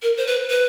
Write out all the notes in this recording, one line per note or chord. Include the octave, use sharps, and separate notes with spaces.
A#4
C5
B4
B4